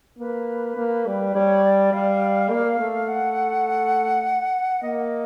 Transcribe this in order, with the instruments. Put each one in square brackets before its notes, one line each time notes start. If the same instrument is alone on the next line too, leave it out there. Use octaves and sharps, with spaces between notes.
[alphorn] A#3 [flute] B4
[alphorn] A#3
G3
[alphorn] G3 [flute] C#5
[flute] D5
[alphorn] G3 [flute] F5
[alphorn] A#3
A3
[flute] F#5
[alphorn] A#3 [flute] D#5